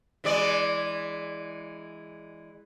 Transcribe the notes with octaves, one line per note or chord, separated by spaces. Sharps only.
E3 G#3 D5